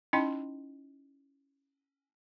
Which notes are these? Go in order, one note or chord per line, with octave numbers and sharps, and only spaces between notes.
C#4 D#4 E4 D#5 G5 C6